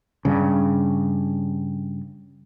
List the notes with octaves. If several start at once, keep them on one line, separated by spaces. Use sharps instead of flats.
G2 C#3